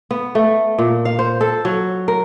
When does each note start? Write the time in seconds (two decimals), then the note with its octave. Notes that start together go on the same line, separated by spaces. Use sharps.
0.11 B3
0.35 A3
0.78 A#2
1.05 F5
1.19 C5
1.41 A4
1.65 F#3
2.08 A#4